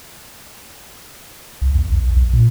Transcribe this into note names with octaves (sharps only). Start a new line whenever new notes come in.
C2
E2
B1
B1
A#2